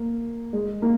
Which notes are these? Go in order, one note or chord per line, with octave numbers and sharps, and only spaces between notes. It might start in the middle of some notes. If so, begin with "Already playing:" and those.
Already playing: A#3
G#3
A#3